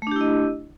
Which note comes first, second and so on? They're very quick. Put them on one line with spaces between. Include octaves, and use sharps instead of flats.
A3 D4 G4 E4 D#5